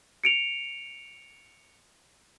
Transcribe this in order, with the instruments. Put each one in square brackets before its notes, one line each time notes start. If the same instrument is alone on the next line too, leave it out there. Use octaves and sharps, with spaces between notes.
[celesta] C#7 D7 F7